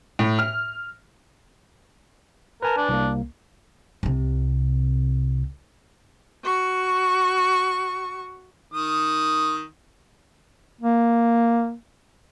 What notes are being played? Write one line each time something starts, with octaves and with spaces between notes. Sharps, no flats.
A2
F6
A#4 B4 G#5 A5
D4
C2 A#3
C2 C3
F#4 C#6
D#3 D#6
A#3